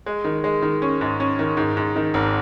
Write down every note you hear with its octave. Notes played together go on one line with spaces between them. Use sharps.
G#3
D#3
G#3
D#3
C#4
G#2
C#4
D#3
G#2
G#2
D#3
G#1